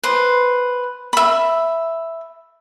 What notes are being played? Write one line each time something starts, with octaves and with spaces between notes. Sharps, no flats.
B4 C5
E5 B5